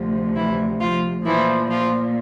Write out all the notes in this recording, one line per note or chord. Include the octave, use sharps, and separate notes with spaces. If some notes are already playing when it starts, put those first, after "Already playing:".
Already playing: D2 C3 F3
E3 E4
F3 F4
A#2 E3 F3 E4
F3 F4